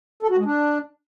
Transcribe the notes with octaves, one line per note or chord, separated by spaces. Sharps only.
A4
F#4
G#3
D4